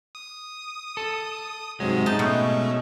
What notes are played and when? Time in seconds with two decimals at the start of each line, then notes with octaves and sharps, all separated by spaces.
0.15 D#6
0.97 A4
1.80 G#2 C3 F#3 G#3
2.06 D#4 A5 A6
2.19 B2 A3 C#4